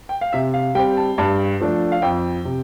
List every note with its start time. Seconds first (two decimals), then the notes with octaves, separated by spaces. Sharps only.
0.09 G5
0.21 F5
0.33 C3 E5
0.54 F5
0.75 G3 G5
0.79 C4
0.97 A5
1.18 G2 A5
1.60 F3 A3 D4
1.92 F5
2.02 F2 G5
2.45 C3